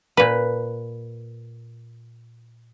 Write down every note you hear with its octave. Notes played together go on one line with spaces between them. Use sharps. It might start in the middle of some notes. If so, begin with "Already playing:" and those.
A#2 B4